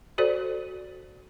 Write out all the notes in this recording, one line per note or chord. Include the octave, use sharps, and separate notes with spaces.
F#4 A4 C5 D5